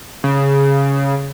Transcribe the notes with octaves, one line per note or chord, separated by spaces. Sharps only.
C#3